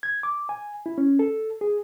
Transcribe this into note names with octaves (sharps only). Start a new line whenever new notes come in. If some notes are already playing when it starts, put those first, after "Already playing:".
G#6
D6
G#5
E4
C#4
A4
G#4